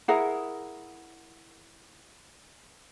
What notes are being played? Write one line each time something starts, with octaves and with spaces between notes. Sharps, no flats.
E4 G#4 A#4 F#5